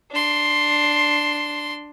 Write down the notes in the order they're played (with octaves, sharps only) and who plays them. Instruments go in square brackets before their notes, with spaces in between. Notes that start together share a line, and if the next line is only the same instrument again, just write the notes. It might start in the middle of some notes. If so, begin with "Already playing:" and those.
[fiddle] D4 C6